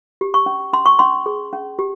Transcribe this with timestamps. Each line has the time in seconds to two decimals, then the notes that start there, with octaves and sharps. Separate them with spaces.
0.21 G4
0.34 C#6
0.46 C#4
0.73 C#4 C6
0.86 C#6
0.99 C#4 C6
1.26 G#4
1.53 C#4
1.79 G4